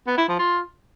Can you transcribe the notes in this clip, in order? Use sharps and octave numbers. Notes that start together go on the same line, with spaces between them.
B3
E4
F3
F4